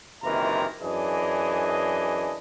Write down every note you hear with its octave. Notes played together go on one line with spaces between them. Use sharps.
F#1 C3 D#3 E3 F4 A#5
F#2 E3 D4 G#4 D#5